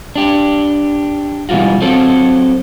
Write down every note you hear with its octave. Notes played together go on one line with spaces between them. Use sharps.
D4 G4
B2 E3 G3 F4 F#4
F#3 C4 A4